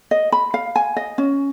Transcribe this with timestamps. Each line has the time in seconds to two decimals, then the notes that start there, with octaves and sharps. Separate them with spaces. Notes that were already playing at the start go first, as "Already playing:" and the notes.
0.11 D#5
0.32 B5
0.54 F5
0.76 G#5
0.97 D#5
1.18 C#4